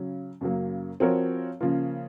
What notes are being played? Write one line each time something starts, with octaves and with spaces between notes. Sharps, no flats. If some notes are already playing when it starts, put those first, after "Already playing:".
Already playing: C#3 F#3 C#4
F#2 C#3 F#3 A#3
F3 C4 F#4 A#4 C#5
C#3 F3 A#3 F4